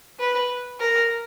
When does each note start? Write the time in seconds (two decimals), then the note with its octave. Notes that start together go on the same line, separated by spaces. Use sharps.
0.20 B4
0.80 A#4